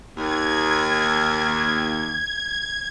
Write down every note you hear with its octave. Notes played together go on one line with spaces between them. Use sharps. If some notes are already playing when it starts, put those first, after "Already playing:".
D#2 G#6